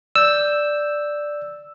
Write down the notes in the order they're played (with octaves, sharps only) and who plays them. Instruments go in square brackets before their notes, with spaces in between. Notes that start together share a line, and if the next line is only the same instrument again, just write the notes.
[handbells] D5 G6 [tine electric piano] E6